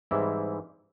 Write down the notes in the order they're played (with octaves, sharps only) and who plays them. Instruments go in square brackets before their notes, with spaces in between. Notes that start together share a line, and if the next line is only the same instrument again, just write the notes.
[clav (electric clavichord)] G#2 E3 G3 C4 E4